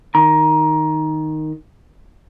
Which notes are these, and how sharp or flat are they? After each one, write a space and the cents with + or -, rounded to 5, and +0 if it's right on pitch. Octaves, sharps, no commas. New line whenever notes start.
D#3 +0 A#5 +20